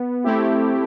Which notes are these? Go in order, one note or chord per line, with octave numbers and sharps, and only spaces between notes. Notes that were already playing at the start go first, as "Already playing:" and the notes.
Already playing: B3
A3 C4 E4 G4